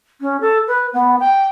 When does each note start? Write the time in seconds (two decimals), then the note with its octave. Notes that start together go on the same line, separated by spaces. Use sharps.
0.21 C#4
0.41 A4
0.67 B4
0.93 B3
1.20 G5